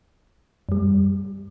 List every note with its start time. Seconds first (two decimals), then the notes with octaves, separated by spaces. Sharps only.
0.69 F#2 G3